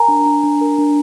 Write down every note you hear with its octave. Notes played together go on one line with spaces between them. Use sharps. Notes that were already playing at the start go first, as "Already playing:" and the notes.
Already playing: A#4 G#5 A#5
D4
D4
D4
A#4
D4